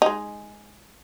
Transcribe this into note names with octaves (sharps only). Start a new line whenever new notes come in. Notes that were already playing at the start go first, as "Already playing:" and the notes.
G#3 D#4